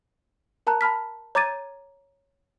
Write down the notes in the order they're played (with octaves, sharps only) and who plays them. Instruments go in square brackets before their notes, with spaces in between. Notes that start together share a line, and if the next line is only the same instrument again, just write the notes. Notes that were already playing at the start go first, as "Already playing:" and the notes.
[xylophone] A#4 A5 A#5 F#6
A5 B5 F6 B6
C#5 A#5 D6 G#6 A6 D#7